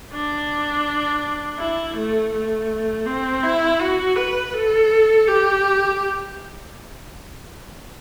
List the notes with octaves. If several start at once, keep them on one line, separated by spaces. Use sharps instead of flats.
D4
E4
A3
A3
C4
E4
F#4
B4
A4
G4